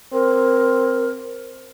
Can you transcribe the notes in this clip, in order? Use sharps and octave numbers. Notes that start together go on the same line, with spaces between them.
C4 A#4